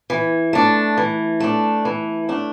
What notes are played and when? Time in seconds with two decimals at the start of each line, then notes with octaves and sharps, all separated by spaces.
0.10 E3
0.53 A3 D4
0.98 E3
1.40 A3 D4
1.85 E3
2.29 A3 D4